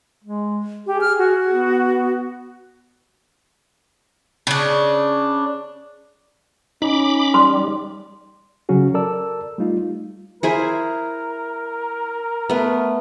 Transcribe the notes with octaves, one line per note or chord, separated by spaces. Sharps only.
G#3
G4 G#4
F6
F#4
B3
C#3 D4
C#4 D#4 B5 D6
G3 C6
C#3 F#3 C#4 F#4 G#4
A4 A#4 D5 A5 E6
G3 A3 D#4 F4
E4 G#4 A#4 C5
A3 B3